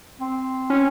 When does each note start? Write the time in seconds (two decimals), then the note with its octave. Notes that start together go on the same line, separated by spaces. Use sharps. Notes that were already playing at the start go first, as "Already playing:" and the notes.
0.20 C4
0.70 C#4